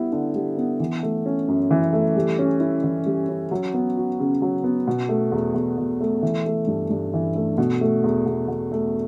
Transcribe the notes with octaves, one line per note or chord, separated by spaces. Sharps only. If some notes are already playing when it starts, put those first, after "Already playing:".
Already playing: G3 B3 E4
D3
G3
B3
E3
A3
C#4
F#2
E3
A3
G3
C#4
E4
E3
G3
C#4
F#3
B3
F#4
C#3
F#3
B3
B2
A3
E2
E2
B2
A3
E3
A3
G2
G2
E3
A3
B2
A3
E2
E2
B2
A3